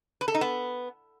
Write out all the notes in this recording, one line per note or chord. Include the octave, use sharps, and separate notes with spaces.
B4
A4
D#4
B3